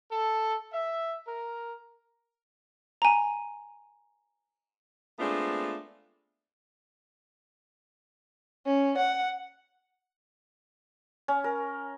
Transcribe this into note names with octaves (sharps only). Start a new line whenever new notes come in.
A4
E5
A#4
G#5 A#5
G#3 A3 B3 C4 D4 F4
C#4
F#5
C#4
A#4